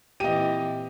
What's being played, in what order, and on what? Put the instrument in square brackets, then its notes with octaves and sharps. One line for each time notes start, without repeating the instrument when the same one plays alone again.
[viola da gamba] A#2 E3 C4 [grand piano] G4 [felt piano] D#5 D#7